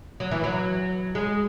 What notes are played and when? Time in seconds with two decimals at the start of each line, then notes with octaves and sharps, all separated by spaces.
0.20 F#3
0.31 E3
0.44 F#3
1.15 G#3